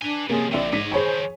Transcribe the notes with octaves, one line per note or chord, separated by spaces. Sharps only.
D4 B4 G#5 G7
G#2 C3 F3 A#3 C#4 G#4
A#1 D#3 F#3 D5 E5 G5
G#2 C#5 D#5 D6 B6
D#3 F3 G#4 C5 C#5 G#5 B5 C#6